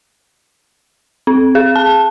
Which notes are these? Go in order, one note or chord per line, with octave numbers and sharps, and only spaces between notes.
C4
G#4
A5